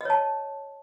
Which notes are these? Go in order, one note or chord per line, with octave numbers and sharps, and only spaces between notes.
C#5 D#5 A5